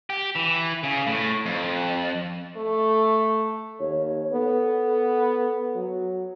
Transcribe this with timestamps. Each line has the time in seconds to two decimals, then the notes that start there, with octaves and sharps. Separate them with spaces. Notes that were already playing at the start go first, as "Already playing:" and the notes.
0.10 G4
0.36 E3
0.83 C#3
1.07 A2
1.46 F2
2.57 A3
3.80 D#2 C#5
4.32 B3 A4
5.75 F#3